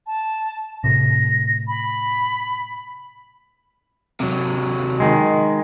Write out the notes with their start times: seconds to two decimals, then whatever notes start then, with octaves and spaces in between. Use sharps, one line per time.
0.07 A5
0.84 A2 C3 A#6
1.67 B5
4.20 C3 F#3
5.00 D#3 G#3